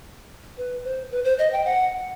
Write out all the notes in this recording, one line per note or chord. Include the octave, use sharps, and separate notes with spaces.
B4
C5
B4
C5
D#5
G5
F#5